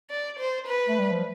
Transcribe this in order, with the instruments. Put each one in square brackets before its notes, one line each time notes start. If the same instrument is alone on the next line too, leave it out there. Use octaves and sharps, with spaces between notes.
[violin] D5
C5
B4
[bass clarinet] A3
G3
F3